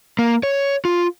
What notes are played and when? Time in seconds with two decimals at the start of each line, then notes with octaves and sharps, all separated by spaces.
0.19 A#3
0.43 C#5
0.85 F4